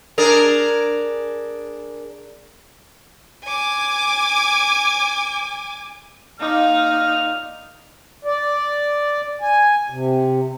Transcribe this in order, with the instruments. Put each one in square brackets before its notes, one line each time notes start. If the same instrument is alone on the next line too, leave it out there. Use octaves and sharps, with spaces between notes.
[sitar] D4 G#4 A#4
[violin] G#5 D6
[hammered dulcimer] A#3 F4 D5 [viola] D#4 [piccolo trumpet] F6
[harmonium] D5
G#5
C3